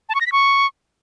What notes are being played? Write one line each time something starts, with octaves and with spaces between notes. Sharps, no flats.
A5
C#6
A#6
B6
C#6